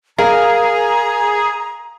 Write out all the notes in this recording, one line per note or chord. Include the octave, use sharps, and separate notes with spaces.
G#4 A#4 F5 A#5